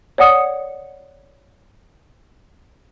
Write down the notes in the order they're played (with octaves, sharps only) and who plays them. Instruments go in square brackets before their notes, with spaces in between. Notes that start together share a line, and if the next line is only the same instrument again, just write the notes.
[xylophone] C#5 D5 F#5 D#6 C#7